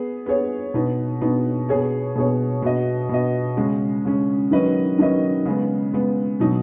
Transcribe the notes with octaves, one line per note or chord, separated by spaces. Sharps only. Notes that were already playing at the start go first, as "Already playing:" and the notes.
Already playing: B3 G#4
B3 G#4 C#5
B2 B3 D#4
B2 B3 D#4
B2 B3 G#4 C#5
B2 B3 G#4 C#5
B2 B3 F#4 D#5
B2 B3 F#4 D#5
C#3 G#3 C#4
C#3 G#3 C#4
D#3 F#3 C#4 B4 D#5
D#3 F#3 C#4 B4 D#5
C#3 G#3 B3
C#3 G#3 B3
B2 F#3 D#4